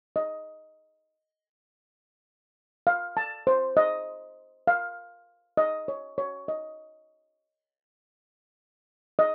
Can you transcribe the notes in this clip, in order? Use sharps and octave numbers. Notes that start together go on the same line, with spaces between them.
D#5
F5
A5
C5
D#5
F5
D#5
C#5
C#5
D#5
D#5